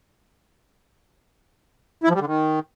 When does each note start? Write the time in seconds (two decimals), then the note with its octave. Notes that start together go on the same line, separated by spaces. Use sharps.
2.04 E4
2.09 F3
2.15 G3
2.20 D3
2.26 D#3